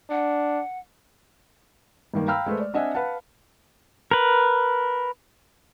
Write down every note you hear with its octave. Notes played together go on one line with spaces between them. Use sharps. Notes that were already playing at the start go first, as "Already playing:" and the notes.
D4 F#5
G2 D#3 A#3
F5 G5 A#5 B5 E6 F6
G#3 A3 B4 C5
D5
C4 D4 D#5 E5 F#5 G#5
B4 F5 F#5 A5
A#4 B4